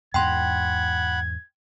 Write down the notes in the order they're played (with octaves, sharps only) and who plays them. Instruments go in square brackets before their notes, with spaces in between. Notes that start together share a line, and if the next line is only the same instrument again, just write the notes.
[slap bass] E2 G#2 [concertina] F#5 B5 [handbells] G5 C6 [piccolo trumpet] G#6